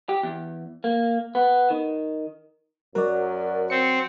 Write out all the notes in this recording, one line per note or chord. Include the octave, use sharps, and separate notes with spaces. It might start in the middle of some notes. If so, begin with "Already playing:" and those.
G4
E2
A#3
B3
D#3
F#2 F#3 A#4 D5
C4 C#7